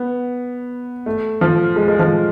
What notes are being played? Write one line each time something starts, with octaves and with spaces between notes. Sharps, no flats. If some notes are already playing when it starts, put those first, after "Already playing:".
Already playing: B3
A3
F3
G#3
G#3
F3